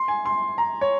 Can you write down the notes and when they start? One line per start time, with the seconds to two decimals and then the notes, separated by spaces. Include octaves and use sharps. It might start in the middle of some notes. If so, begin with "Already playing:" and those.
Already playing: C6
0.08 G#5
0.25 C6
0.58 A#5
0.81 C#5